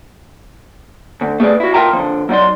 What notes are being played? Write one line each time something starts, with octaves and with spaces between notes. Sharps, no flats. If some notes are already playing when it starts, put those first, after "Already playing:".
D2
A3 G#4 A4 B4 D5
E4 F#4
F4 A#4 E5 G5 A5 A#5
D3 F3
F#3 D#4 D5 C6